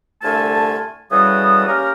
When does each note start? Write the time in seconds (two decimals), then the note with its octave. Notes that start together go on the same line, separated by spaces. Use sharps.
0.22 C2 D3 A3 F4 G#5 A5
1.11 C#3 E3 G3 F#4 A4 D#6
1.67 A#3 C#4 G4 A#4